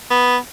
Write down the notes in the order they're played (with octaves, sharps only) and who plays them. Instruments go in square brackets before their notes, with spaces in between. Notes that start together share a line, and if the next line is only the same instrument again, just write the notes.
[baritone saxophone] B3